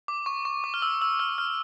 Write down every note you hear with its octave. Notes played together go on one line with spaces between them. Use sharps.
D6
C#6
C#6
D6
F6
E6
E6
F6
F6